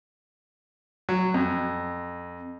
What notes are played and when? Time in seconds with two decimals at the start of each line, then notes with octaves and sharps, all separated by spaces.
1.09 F#3
1.34 F2